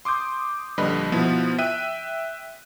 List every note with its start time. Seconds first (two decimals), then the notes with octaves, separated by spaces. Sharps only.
0.05 C6 D6 D#6 G6
0.78 A#1 D3 G3 B4 D#5 B5
1.12 B2 F3 B3 E4
1.58 E5 G5 F#6 D#7